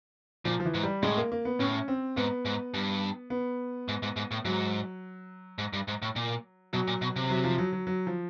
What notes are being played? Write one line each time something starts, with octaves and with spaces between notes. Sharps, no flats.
A#2 F3
F3
E3
G#2
G3
A2 G#3
A#3
A#3
B3
A2 C#4
C4
G#2 B3
G#2
G2
B3
G#2
G#2
G#2
A2
G#2 F#3
G#2
G2
G#2
A2
A#2
B2 F#3
A#2
B2
C3
F#3
F3
F#3
F#3
F#3
F3